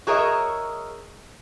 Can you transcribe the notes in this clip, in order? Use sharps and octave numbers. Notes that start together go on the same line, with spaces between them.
F#4 G#4 A#4 C#5 D#5 E5